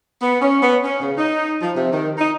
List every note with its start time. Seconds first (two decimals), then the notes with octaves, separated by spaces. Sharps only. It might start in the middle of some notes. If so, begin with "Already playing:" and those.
0.20 B3
0.41 C#4
0.61 B3
0.84 C#4
1.00 C#3
1.16 D#4
1.60 F3
1.76 C3
1.93 D#3
2.18 D#4